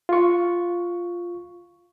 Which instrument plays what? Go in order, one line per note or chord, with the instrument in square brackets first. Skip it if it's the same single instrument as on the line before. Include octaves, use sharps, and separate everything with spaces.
[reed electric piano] F4 C#6